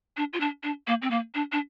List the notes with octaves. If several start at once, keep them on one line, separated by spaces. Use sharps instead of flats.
D4
F4
D4
D4
A#3
C4
A#3
D4
D4